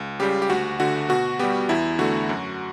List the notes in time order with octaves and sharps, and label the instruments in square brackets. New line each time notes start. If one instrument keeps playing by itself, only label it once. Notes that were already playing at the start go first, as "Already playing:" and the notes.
Already playing: [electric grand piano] C#2
C#3 G3 G4
G4
D2 F#4
D3 A3 F#4
B2 F#4
G3 B3 G4
E2 E4
D3 A3 F#4
F#2